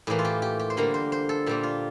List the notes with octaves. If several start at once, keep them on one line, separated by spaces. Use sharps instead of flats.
A2 E3 A#3 G4
F4
G4
G4
G4
C5
D3 G3 A#3 A#4
C5
C5
A4
A#2 G3 A#3 G4
F4